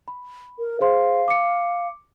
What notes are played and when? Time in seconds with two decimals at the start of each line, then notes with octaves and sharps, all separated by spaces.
0.08 B5
0.59 A#4
0.81 G#4 C5 F5 C6
1.28 D6 C#7